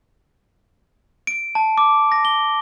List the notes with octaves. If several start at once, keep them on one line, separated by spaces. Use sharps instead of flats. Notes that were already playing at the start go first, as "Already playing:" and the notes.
D7
A5
D6
A#6
G7